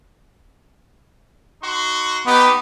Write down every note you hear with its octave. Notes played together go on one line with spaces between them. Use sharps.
D#4 F#4 C6
B3 D#4 G4